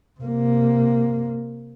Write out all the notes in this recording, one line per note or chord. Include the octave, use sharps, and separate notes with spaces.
C3 A#3